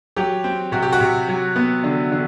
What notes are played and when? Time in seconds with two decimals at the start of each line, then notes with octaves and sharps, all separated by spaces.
0.16 F#3 G4
0.44 C4
0.72 C3 F#4
0.82 G4
0.92 F#4
1.00 C3
1.28 F#3
1.56 B3
1.84 D3
2.12 D3